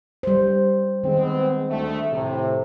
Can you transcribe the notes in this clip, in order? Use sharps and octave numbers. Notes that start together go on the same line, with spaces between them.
G3 C5
D#3 G#3 B3 C4
D2 A3
A2 C3